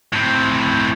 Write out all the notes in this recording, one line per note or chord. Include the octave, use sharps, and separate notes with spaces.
A2 C4